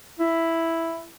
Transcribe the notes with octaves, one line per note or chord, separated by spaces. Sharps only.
E4